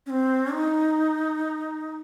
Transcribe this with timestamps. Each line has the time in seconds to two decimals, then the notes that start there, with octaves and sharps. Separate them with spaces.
0.06 C#4
0.10 C4
0.52 D#4